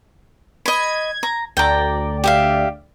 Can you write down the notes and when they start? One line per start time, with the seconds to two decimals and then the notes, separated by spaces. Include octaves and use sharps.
0.66 D#5 B5 G#6
1.23 A#5
1.57 D2 D3 D5 G5 A#5
2.24 G4 E5 F5